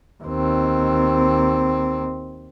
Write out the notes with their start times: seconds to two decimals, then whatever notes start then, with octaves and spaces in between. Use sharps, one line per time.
0.23 D#2 C4